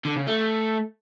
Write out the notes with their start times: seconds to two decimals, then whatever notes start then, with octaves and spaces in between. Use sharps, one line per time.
0.05 D3
0.16 C#3
0.27 A3